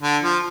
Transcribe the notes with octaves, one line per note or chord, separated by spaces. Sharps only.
D3
F3